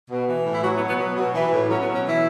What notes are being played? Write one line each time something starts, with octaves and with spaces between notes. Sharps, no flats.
B2
E3
A2
E4
F#3 F#4
B3
B2
B3
F#3 B3
B2
E3
A2
F#3 C#4
B3
B2
C#4
E3 E4